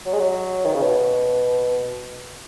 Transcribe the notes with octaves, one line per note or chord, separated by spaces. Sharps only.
F#3
G#3
F#3
D#3
C#3
B2